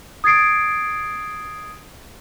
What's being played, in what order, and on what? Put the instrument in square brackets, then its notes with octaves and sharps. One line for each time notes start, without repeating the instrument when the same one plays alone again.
[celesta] D#6 G#6 A6 C7 D7